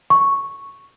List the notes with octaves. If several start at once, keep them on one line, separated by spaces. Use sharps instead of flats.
C#6